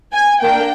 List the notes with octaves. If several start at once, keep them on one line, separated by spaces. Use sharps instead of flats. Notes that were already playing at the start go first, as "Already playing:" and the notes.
G#5
A#3 D4 G5